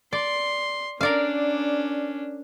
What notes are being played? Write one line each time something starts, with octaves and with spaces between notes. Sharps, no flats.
D5 C6
C#4 D4 A#4 D5 F5